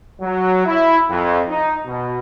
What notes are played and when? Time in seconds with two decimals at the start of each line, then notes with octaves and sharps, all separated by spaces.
0.21 F#3
0.66 E4
1.10 F2
1.49 D#4
1.86 B2